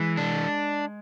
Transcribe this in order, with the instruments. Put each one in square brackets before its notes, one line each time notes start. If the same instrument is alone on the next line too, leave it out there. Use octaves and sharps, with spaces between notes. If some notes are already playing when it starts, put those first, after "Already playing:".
Already playing: [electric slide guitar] E3 [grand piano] G#3
[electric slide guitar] D4